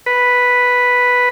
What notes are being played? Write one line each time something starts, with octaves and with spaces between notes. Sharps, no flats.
B4